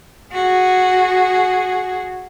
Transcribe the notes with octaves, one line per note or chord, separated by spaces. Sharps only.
F#4 G#4